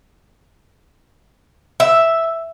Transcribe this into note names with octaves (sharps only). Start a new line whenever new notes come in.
E5